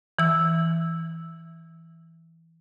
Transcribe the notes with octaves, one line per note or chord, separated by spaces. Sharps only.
E3 E6